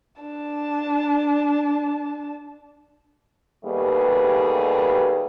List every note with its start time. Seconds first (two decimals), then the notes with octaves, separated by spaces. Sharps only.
0.22 D4 A5
3.65 D#2 G3 A3 B3 G#4 B4